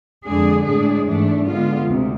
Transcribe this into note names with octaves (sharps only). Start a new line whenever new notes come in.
F2 D3 G#3 D4 G#4
A2 G#3 D4 G#4
G#2 E3 A3 D4
D3 G#3 B3 F4
D2 C3